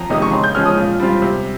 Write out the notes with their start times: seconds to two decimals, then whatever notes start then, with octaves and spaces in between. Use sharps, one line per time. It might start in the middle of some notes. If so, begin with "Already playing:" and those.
Already playing: F2 A#5
0.10 C3 D#3 G#3 D#4 D#6
0.22 C#6
0.32 C#3 C6
0.44 G6
0.55 F3 G#3 C#4 F6
0.65 D#6
0.77 A#2
1.00 G3 C4 F4
1.22 C3